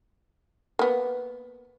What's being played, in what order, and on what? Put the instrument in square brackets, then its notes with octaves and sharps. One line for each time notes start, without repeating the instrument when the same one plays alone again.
[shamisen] A#3 B3